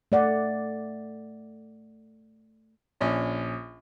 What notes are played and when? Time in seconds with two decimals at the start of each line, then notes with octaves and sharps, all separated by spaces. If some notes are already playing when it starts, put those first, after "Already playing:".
0.12 A3 D5 F#5
3.01 A#1 C#4 D4